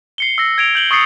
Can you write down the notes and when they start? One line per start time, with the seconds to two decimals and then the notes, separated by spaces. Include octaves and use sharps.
0.18 C7 C#7 G7
0.38 E6 A#6
0.58 G#6 D7 F7
0.75 G6 F#7 G7
0.91 C#6 D#6 A6 C7 C#7